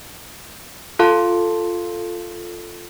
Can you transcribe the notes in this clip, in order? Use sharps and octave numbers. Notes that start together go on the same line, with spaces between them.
F4 A4 F5 A5 C6